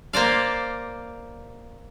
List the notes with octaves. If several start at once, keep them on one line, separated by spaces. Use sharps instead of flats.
A#3 C5 D5 F5